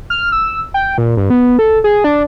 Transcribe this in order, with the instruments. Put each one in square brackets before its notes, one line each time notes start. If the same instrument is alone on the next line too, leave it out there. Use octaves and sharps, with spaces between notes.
[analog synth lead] F6
E6
G5
A#2
G2
B3
A4
G#4
D4